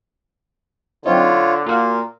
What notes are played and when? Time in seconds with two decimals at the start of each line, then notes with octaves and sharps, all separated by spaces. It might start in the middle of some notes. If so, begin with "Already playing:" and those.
1.06 D3 F#3 C4 D#4 F4 C#5
1.66 A#2 A#3 F4 F#4